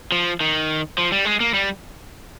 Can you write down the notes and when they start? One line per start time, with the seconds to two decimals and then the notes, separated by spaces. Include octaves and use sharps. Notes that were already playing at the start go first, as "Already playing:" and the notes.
0.12 F3
0.41 D#3
0.98 F3
1.12 G3
1.25 G#3
1.40 A#3
1.54 G3